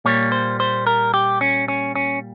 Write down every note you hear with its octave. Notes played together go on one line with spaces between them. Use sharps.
A#2 G3 A#3 C#5
C5
C5
A#4
G4
C#4
C#4
C#4